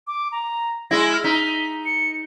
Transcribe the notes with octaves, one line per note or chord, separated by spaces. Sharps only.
D6
A#5
G#3 E4 A#6
F6
D#4 B6
C#7